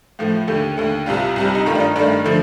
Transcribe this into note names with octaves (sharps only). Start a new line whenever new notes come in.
A2 F3 A3
D#2 D3 A3 G4
D#2 D3 A3
C2 C3 G3 F4
C2 C3 G3
D#4
G2 D#3 A3 F4
D4
D#4
G2 D#3 A3 D4
D3 F3 A3